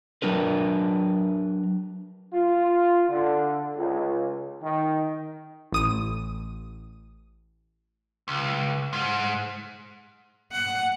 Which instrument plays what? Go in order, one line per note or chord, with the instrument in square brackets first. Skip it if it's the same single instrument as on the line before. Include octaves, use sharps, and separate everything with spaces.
[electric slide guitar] F#3 D4 A#4 B4
[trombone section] F4
D3
C#2
D#3
[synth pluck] A1 D#6 D#7
[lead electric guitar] C#2
G#2
[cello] F#5